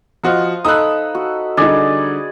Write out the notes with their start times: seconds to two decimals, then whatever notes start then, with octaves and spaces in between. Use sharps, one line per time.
0.23 F3 F#4 C5 D#5 F5
0.65 D#4 A4 B5 D#6 E6 F#6
1.15 F#4
1.57 D3 G3 D#4 G#4 D5 D#5